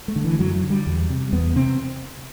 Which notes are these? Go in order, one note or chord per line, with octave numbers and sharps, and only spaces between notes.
A3
D3
E3
F#2 F#3
F#3
D3
G3
E2
C3
E2 B3
C3 C4